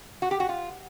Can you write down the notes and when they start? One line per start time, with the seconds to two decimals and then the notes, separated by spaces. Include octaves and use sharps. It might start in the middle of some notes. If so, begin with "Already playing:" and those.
0.22 F#4
0.31 G4
0.40 F#4
0.49 F4